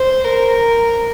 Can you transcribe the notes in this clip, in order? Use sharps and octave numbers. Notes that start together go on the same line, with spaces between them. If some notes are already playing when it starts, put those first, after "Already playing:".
Already playing: C5
A#4